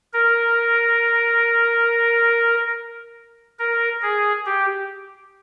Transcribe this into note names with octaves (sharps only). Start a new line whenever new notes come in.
A#4
A#4
G#4
G4